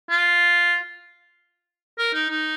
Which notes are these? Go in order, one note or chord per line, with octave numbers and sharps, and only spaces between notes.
F4
A#4
D#4
D#4